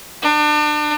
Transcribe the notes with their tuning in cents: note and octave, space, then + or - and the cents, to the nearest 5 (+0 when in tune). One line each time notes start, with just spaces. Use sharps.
D4 +35